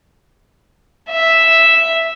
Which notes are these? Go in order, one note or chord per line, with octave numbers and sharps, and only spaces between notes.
E5